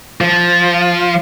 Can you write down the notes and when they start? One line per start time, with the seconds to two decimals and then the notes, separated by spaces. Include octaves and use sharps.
0.21 F3